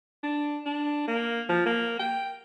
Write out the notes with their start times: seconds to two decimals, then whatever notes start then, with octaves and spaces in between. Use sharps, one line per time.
0.23 D4
0.66 D4
1.08 A#3
1.49 F3
1.66 A#3
2.00 G5